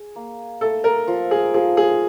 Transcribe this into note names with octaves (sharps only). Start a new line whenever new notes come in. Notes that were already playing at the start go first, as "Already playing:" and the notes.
Already playing: G#4
A#3
A3 A4
A#4
F3
G#4
F3 G#4
G#4